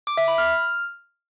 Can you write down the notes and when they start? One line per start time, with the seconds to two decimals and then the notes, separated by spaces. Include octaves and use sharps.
0.07 D6
0.17 E5
0.28 B5
0.38 F6